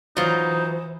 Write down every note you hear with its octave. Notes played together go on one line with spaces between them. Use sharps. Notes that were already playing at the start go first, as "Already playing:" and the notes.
E3 F#3 D#4 F4 C5